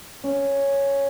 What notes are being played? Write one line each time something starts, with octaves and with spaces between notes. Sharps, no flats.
C#4